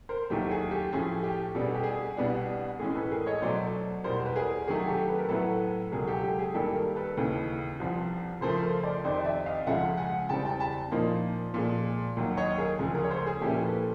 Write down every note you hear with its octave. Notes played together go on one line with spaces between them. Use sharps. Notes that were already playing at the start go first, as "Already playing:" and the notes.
A#4 C5
D#2 D#3 F#3 A3 G4
G#4
G4
A2 F3 A3 C#4 G#4
G4
B2 G3 B3 D4 A4
G#4
G4
G#4
C2 B2 G3 B3 D4
A2 E3 G#3 C#4 G#4
A4 B4
G#4 A#4
C#5 D#5
B2 F#3 A3 C5 D5
E2 B2 G3 A#4 C5
B4
G#4 A#4
C3 D#3 F#3 A3 G#4
G4 A4
B4
A#4
A2 F#3 B3 E4 A4 B4
C#2 B2 F#3 G#4 A#4
G4 A4
G4
G#4
G2 D#3 G3 A#3 G4 A4
G#4 A#4
A4 B4
D#2 C#3 E3
C2 C3 F3
C#3 F3 A3 A#4 C5
A#4 C5
C5 D5
F2 C3 D#3 C5 D5
D5 E5
D#5 F5
C#2 C#3 F3 G#3 E5 F#5
F#5 G#5
E2 C#3 E3 G3 C4 G5 A5
G5 A5
A5 B5
A#2 F3 A#3 D#4
A#2 F3 G#3
D#2 D#3 F#3
C#5 D#5
G#4 A#4
D2 C#3 F3 G#3
G#4 A#4
C#5
A#4 C5
G#4
A#2 F3 A#3 C#4 E4 G4 A4
A4 B4